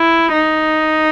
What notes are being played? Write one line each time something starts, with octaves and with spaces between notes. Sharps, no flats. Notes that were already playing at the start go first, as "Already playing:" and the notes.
Already playing: E4
D#4